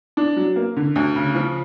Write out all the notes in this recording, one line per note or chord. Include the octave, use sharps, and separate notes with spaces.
D4
F#3
A#3
D3
D2
C#3
F3